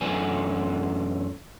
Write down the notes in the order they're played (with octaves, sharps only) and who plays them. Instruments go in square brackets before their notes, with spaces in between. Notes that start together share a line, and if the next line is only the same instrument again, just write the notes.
[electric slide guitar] F#2 A2 D3 E3 B3 G#5